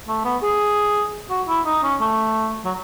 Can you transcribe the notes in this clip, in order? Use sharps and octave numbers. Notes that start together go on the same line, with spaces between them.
A3
B3
G#4
F#4
E4
D#4
C#4
A3
F#3